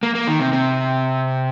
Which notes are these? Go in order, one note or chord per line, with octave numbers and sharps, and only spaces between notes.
A#3
A#3
D#3
C3
C3